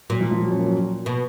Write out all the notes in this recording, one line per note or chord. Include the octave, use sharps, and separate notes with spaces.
A#2 F#3
F3
F3
F#3
C#4
A#3
F#3
B2